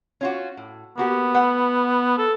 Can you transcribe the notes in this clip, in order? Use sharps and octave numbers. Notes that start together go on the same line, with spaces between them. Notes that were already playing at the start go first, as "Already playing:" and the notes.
C#4 F4 F#4
A2
A#3 B3 F#4 G4
A3 B4 F#5
A4